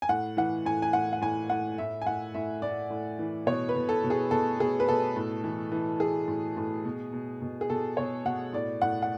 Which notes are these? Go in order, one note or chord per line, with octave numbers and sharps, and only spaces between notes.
G#5
A2 F#5
E3 F#5
A2 G#5
G#5
A2 F#5
F#5
A2 G#5
A2 F#5
A2 E5
G#5
A2 F#5
A2 E5
A2 D5
A2
E3
B2 C#5
B4
B2
A4
B2
G#4
B2 A4
B2 G#4
B4
B2 A4
A2
E3
E3
E3 G#4
A2
A2
B2
B2
B2
G#4
B2 A4
B2 C#5
B2 F#5
A2 D5
A2 F#5
F#5